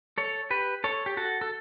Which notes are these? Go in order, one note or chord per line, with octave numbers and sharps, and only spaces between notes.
A4 C#5
G4 B4
A4 C#5
G4
F#4 A4
A4